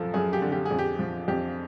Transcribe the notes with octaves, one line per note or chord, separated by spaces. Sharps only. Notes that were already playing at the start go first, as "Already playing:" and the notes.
Already playing: F#2 F3 A4
F#2 G#4
G4
D3
G4
G#4
F2
G4
F3
F2 G4